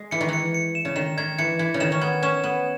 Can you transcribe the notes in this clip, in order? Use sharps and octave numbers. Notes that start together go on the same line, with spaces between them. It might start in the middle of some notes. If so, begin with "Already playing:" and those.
Already playing: G#3
E3 C#7
D#3
E3 C#7
C#7
E7
C#3
D#3 E7
D#3 G#6
E3 C#7
E3 G#6
C#3
D#3 E7
C#4
B3 G#6
C#4 E7
B3 E7